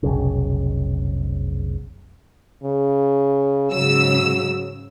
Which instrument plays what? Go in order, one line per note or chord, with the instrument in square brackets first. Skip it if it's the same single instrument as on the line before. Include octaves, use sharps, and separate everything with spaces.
[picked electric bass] F1 B1 C#3
[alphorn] C#3
[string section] G#2 C#3 E6 [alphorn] F#3